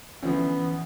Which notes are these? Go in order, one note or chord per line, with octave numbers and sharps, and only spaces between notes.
D2 E3 F3 B3 C#4